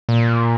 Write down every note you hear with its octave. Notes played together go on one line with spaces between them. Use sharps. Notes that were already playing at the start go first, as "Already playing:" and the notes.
A#2